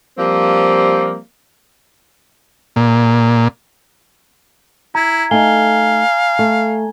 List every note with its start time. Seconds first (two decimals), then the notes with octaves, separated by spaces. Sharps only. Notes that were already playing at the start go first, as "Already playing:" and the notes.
0.17 F3 G3 A#3 C4
2.76 A#2
4.95 E4 A#5 G#6
5.31 A3 D#4 F5 G#5 G7
6.39 A3